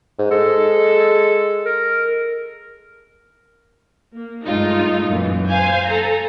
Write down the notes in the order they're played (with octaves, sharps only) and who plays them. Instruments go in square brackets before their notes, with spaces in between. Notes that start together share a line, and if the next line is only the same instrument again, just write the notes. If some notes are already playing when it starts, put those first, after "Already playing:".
[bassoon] G#2
[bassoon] G#3 [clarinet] A4
[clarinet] A#4
[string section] A#3
G2 G#3 A3 D#4 F4
F#2 A#2 E3
C5 F5 G#5 G6
A4 A#5